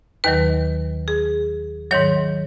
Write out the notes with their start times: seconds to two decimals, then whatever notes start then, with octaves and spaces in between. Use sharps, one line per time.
0.24 D#2 D#3 F#3 B4
1.08 G#4
1.91 G#2 D#3 F#3 C#5